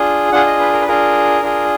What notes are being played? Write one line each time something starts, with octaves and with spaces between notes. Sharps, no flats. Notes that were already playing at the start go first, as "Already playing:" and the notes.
Already playing: D4 F4 G#4
D4 F4 G#4 F#5
D#5
B4
A#4
B4
D4 F4 G#4 A#4
D4 F4 G#4